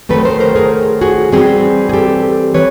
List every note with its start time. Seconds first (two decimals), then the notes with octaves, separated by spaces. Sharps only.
0.09 D#3 F#3 A3 C4 A4 B4
0.25 A#4 C5
0.40 A#4 C5
0.55 G#4 A#4
1.01 F#4 G#4
1.32 E3 G3 C4 F#4 G#4
1.89 G#4
1.93 G4 A4
2.54 E3 B4 C#5